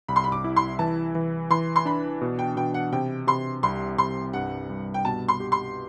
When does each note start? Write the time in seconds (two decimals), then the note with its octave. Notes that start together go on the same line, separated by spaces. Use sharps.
0.08 C2 B5
0.16 C6
0.24 B5
0.32 D6
0.44 E4
0.56 C6
0.79 E3 A5
1.15 E3
1.50 E3 C6
1.76 C6
1.85 D4 B5
2.21 B2
2.39 G5
2.57 B2 G5
2.74 F#5
2.92 C3 G5
3.27 C3 C6
3.63 C2 C6
3.98 C2 C6
4.33 G2 F#5
4.70 G2
4.94 G5
5.05 B2 A5
5.28 C6
5.40 G4
5.52 C6